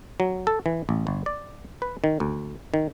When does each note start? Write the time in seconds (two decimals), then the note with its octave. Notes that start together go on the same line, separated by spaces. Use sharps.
0.20 F#3
0.47 A4
0.66 E3
0.89 A1
1.07 G1
1.26 D5
1.82 B4
2.04 D#3
2.20 D2
2.74 D#3